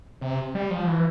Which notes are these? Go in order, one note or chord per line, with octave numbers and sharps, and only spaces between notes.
C3
G3
F3
E3